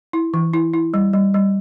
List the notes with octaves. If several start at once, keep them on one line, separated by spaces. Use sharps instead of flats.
E4
E3
E4
E4
G3
G3
G3